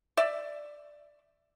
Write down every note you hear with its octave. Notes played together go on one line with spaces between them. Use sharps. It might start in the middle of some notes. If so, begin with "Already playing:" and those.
D5 E5